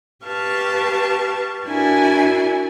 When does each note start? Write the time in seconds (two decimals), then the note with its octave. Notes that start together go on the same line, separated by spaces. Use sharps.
0.25 G4 B4 F5 A5 C#6
1.67 D4 E4 F#4 A#4 G#5